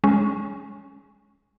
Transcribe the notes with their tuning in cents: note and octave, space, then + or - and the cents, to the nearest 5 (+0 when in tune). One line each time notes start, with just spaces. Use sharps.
G#3 +0 C#4 +0